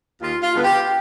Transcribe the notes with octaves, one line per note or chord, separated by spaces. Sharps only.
D#2 F4
F4
D3 G#3 B3
G4